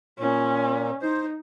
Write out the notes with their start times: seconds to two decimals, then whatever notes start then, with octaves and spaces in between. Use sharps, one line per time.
0.19 A#2 C#4
1.02 D#4 C5